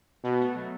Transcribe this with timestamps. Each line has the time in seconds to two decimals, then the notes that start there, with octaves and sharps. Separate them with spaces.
0.24 B2 B3
0.40 A3
0.55 F#3